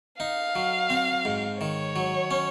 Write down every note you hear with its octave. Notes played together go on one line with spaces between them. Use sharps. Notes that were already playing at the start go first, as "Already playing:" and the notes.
D#4 F5
F#3
C4
G#2
D#3 C#5
F#3
C#4